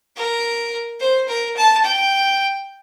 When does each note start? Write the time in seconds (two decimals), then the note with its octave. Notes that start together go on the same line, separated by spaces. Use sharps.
0.16 A#4
1.00 C5
1.29 A#4
1.57 A5
1.84 G5